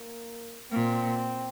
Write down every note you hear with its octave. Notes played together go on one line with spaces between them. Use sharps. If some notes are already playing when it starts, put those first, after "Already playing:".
Already playing: A#3
A#2 C4